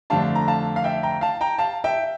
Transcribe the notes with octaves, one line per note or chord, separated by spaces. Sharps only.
F2 D3 A3 D4 F5 A5
A#5
F5 A5
F5
E5 G5
G5 A#5
F5 A5
G5 A#5
F5 A5
E5 G5